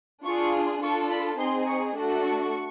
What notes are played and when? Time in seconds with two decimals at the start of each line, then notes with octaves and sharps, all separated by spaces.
0.24 D4 F4 G#4 C#6
0.81 D4 F4 A4 C#6
1.10 B5
1.39 C4 D#4 G#4 C6
1.67 C#6
1.95 A3 D4 F#4 A4
2.24 C#6